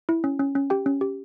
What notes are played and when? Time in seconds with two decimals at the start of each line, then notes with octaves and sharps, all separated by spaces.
0.09 E4
0.24 C#4
0.40 C#4
0.55 C#4
0.70 G4 G5
0.86 C#4
1.01 G4